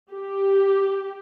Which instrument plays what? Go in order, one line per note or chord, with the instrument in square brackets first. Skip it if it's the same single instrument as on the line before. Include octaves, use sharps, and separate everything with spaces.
[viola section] G4